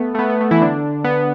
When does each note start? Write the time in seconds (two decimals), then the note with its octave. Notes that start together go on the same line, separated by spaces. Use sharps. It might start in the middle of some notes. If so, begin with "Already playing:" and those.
Already playing: A3 B3
0.15 A3
0.19 B3
0.30 B3
0.41 A3
0.51 E3 E4
0.62 D3 D4
1.04 B3